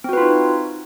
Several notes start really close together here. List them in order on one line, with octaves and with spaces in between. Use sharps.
C4 F#4 B4 F4 D#4